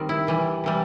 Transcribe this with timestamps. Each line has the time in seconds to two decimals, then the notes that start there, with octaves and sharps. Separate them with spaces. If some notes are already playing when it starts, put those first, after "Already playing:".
Already playing: D#3 G3 C4
0.09 E4
0.27 C3 E3 G3
0.64 C3 E3 G3